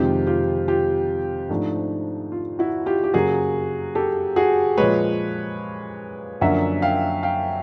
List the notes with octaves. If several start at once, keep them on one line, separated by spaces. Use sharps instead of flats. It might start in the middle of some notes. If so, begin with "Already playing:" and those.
Already playing: F2 C3 D#3 G#3 C4 F4 G4
F4 G4
F4 G4
G#2 F3 A3 D4
F4
E4 F#4
F4 G4
G4
F#2 C#3 F#3 A#3 F#4 G#4
G4 A4
F#4 G#4
A#2 F3 G#3 B4 C#5
F#2 D3 F3 A#3 D4 E5 F#5
F5 G5
F5 G5